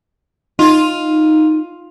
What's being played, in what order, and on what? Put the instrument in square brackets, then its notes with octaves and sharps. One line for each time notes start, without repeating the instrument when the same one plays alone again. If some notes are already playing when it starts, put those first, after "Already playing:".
[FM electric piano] D#4 [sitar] F4